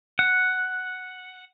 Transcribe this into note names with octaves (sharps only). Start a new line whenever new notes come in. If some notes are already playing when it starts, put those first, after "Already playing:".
F#5